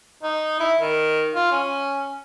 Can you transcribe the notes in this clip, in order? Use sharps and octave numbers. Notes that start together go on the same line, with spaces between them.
D#4
E4
D#3
F4
C#4